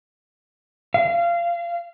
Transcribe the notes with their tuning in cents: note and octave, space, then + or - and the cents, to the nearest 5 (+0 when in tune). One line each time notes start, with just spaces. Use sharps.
F5 -25